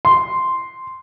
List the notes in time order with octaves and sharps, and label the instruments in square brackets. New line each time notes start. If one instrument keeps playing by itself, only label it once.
[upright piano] C6